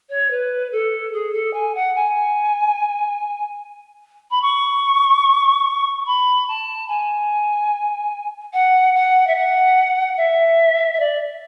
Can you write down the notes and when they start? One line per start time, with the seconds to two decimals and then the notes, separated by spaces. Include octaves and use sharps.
0.09 C#5
0.30 B4
0.72 A4
1.13 G#4
1.33 A4
1.53 G#5
1.74 F#5
1.95 G#5
4.30 B5
4.42 C#6
6.06 B5
6.48 A5
6.88 G#5
8.53 F#5
8.94 F#5
9.27 E5
9.35 F#5
10.17 E5
10.93 E5
10.99 D5